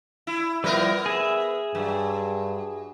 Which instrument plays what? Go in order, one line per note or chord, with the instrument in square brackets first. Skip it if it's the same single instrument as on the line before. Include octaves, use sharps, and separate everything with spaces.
[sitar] E4
[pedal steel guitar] F3 G3 E4 [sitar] B3 A#4 B4
[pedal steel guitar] G#4 E5
[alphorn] G2 [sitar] F#3